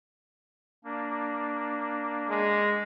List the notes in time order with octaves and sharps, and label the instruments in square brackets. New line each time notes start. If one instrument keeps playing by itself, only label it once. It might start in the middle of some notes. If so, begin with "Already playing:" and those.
[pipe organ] A#3 D4
[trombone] G#3